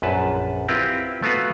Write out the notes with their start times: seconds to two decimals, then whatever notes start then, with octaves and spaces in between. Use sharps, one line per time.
0.02 A#1 F#2 B4 A5
0.68 C4 E4 F4 G4 A#4 B4
1.22 A3 B3 F4 F#4 B4